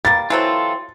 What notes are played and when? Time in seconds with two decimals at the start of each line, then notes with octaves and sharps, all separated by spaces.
0.05 G3 A#3 A6
0.30 E3 F#3 C4 F4 A4